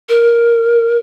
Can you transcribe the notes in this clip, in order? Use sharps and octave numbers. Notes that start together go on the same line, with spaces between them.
A#4